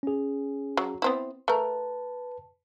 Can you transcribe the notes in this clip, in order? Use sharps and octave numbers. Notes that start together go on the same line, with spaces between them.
C#4 G#4
F#3
B3 C4 E4
A3 A#4 B4 A5